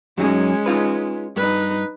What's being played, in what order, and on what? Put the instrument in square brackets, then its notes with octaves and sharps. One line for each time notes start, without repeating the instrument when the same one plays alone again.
[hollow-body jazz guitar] F#2 F#3 D#4 [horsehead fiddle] G#3 C#4
[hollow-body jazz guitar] D#4 F4 B4
[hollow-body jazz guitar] G2 [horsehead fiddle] D#4 B4